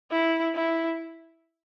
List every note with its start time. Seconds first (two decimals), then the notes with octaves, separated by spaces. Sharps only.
0.11 E4
0.55 E4